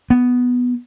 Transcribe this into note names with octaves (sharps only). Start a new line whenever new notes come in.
B3